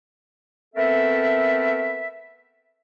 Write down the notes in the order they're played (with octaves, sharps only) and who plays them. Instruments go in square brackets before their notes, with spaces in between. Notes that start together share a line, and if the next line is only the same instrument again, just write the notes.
[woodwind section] A3 B3 C4 A4 A#4 E5